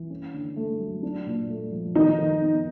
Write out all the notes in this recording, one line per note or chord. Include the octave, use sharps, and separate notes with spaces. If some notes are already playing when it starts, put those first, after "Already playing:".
Already playing: E3
C#4
D3
A3
F#3
D4
A#2
A3
F3
D#3 D#4
D#3
B3